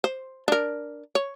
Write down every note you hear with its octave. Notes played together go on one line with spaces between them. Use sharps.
C5
D4 A#4
C#5